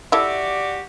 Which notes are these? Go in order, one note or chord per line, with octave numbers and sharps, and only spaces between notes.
E4 F#4 G4 A4 D5 E5